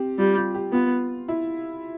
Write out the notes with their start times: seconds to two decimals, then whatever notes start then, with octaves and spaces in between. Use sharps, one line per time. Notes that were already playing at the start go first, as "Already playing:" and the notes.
Already playing: C4 G4
0.18 G3 F4
0.37 F4
0.55 G4
0.73 B3 F4
1.28 E4